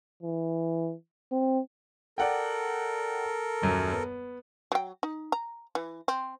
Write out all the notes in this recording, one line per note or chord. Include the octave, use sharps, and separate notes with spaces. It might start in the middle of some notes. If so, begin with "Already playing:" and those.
E3
C4
A4 A#4 D5 F#5 G5
D#1 F#2 F#3
B3
F#3 G5
D#4
A#5
E3
C4